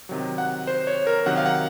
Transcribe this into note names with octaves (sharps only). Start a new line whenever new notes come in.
C3 D#3 F#3
F#5
C5
C#5
A#4
C3 D#3 F#3 F#5
F5
F#5